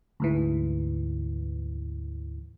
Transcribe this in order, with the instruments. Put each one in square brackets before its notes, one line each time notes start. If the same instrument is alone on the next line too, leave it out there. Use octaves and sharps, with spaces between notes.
[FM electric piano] D2 G#2 E3